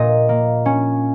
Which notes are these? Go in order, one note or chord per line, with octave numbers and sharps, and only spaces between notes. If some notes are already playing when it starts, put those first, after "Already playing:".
Already playing: A#2 D#5
A#3
C#4